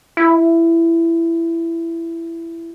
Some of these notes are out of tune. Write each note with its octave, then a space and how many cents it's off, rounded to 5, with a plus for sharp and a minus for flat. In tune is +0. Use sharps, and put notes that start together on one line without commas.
E4 +15